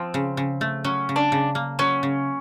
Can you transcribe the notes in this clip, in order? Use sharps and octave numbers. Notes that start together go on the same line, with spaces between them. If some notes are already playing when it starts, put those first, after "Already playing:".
Already playing: F3 C4
C#3
C#3
A3
F#3 C#4
C#3
D4
C#3
A#3
F#3 C#4
C#3